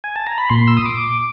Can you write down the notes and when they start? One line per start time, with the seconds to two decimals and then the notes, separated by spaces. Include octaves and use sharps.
0.04 G#5
0.16 A5
0.27 A#5
0.38 B5
0.50 A#2 C6
0.68 E6
0.77 D#6
0.86 D6